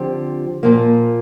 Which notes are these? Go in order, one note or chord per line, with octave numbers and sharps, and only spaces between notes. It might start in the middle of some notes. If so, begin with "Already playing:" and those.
Already playing: D3 F3 C4 G4
A#2 F3 A#3